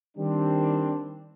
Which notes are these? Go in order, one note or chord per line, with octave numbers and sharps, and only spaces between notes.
D#3 G3 C4 D4